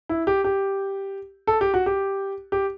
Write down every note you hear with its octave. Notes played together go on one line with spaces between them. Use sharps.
E4
G4
G4
A4
G4
F#4
G4
G4